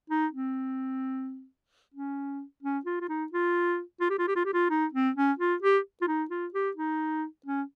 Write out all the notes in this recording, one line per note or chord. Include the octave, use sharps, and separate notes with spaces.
D#4
C4
C#4
C#4
F4
F4
D#4
F4
F4
G4
F4
G4
F4
G4
F4
D#4
C4
C#4
F4
G4
F4
D#4
F4
G4
D#4
C#4